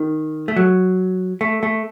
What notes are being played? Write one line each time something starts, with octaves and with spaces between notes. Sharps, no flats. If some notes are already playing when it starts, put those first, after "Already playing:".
Already playing: D#3
A3
F#3
A3
A3